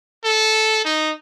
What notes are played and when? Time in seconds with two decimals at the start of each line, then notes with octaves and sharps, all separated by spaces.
0.24 A4
0.85 D#4